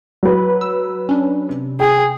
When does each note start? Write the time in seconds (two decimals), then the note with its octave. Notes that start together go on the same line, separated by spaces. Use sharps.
0.23 F#3 B4
0.61 E6
1.09 C#4 D4
1.49 C3
1.80 G#4 G5